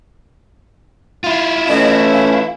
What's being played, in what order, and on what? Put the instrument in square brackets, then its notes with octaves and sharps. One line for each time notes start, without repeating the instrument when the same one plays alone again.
[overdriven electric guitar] E4 F4
[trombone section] E3 A3 C#4 [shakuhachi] D#5
[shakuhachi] F5